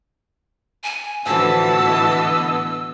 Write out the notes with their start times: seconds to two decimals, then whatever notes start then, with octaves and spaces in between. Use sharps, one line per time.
0.84 G#5
1.26 A2 D3 E3 F3 F#4 A5 E6
1.82 B3 D#5